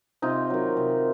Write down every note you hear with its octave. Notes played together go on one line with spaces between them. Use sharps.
C3 D#4 F4
D#3 F#3
C3